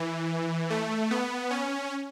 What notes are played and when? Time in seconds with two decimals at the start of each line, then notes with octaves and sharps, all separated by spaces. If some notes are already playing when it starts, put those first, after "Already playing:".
Already playing: E3
0.70 A3
1.11 B3
1.50 C#4